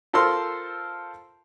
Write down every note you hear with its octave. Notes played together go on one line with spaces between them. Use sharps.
F4 A4 A#4 C5 C6 E6